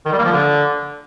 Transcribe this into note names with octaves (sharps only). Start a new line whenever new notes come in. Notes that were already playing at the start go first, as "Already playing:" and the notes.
D#3
G3
A#3
F3
D3